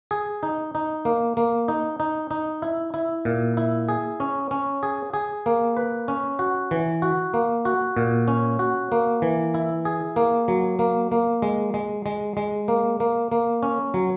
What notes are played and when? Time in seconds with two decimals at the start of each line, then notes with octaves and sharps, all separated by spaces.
0.11 G#4
0.43 D#4
0.75 D#4
1.05 A#3
1.37 A#3
1.68 D#4
2.00 D#4
2.31 D#4
2.62 E4
2.94 E4
3.25 A#2
3.57 E4
3.89 G#4
4.20 C#4
4.51 C#4
4.83 G#4
5.14 G#4
5.46 A#3
5.77 B4
6.08 C#4
6.39 F#4
6.71 E3
7.02 F#4
7.34 A#3
7.65 F#4
7.97 A#2
8.28 C#4
8.59 F#4
8.92 A#3
9.22 E3
9.54 E4
9.85 G#4
10.16 A#3
10.48 F#3
10.79 A#3
11.12 A#3
11.42 G#3
11.74 G#3
12.06 G#3
12.37 G#3
12.68 A#3
13.00 A#3
13.32 A#3
13.63 C#4
13.94 F#3